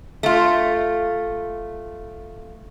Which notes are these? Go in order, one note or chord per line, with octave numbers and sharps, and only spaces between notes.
A3 F4